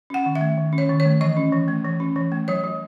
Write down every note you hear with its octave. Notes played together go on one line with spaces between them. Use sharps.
C#4 F#5
D#3
E5
A3
D#3
C#4
C#5
D#3
C#5
A3
E3 D#5
C#4
E3
A3
E3
C#4
E3
A3
F#3 C#5
F#3